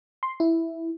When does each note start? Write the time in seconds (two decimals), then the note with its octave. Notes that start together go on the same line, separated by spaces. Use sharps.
0.23 C6
0.40 E4